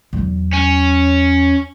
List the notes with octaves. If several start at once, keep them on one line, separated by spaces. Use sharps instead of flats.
E2 F#3
C#4